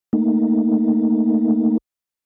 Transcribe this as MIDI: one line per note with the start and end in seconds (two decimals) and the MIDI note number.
0.13 1.78 57
0.13 1.78 58
0.13 1.78 63